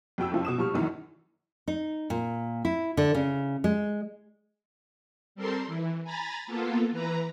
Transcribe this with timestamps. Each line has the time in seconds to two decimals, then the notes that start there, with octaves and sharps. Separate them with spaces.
0.18 F2 F#4 G5 E6
0.32 F#1 F2 F3 F4
0.45 B2 D#6 E7
0.58 F3 G3 C#6 F6
0.74 G#1 F#2 D#3 E3 A#5
1.68 D#4
2.10 A#2
2.65 E4
2.97 D3
3.15 C#3
3.64 G#3
5.35 G3 C4 A4 A#4 C6
5.67 E3
6.04 G#5 A#5 B5 A6
6.47 A#3 B3 F4 A4
6.91 E3 B4 A#5